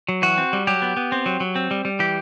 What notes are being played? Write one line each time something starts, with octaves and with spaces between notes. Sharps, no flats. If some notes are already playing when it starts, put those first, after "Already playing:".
F#3
E3 F#4
C4
G3
F#3 G4
B3
B3
C4
F#3
F#3
C4
G3
G3
E3 G4